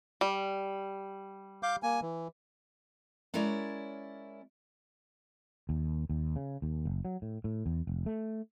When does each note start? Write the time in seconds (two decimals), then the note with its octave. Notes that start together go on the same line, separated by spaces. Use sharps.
0.21 G3
1.63 F5 D6 G6
1.83 A#3 G#5
2.02 E3
3.34 G#3 C#4 E4 A#4 C#5 D5
5.69 D#2
6.10 D#2
6.36 C#3
6.62 D#2
6.85 F#1
7.05 F#3
7.22 A2
7.44 A2
7.66 E2
7.87 F1
8.06 A3